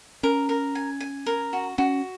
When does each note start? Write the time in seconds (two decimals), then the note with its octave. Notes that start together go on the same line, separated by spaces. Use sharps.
0.23 C#4 A#4
0.49 A#4
0.75 G#5
1.00 G#5
1.26 A#4
1.53 F#4
1.78 C#4 F#4